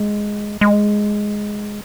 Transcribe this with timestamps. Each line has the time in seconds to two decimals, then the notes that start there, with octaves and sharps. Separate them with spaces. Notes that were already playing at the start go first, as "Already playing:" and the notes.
Already playing: G#3
0.61 G#3